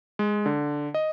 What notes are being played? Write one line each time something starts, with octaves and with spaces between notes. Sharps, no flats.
G#3
D3
D#5